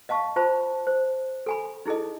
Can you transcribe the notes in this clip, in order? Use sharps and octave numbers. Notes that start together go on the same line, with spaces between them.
D#5 F5 A5 C#6
F4 C5 A5 B5
C5
A4 G#5 B5
D#4 E4 G#4 A4 D#5